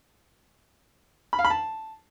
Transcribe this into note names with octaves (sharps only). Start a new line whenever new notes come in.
B5
F5
B5
A5